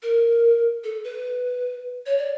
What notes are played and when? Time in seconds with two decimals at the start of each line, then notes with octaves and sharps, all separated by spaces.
0.03 A#4
0.84 A4
1.04 B4
2.06 C#5
2.18 D5